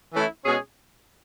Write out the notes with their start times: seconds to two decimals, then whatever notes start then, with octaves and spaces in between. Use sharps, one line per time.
0.13 E3 A3 C#4 E4
0.45 B2 G#3 C#4 G#4